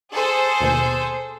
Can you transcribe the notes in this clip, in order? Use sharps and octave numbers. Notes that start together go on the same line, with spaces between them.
G#4 A4 C5
D#2 B2 G6